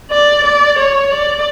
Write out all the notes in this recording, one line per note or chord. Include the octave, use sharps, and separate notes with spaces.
D5
D5
C#5
D5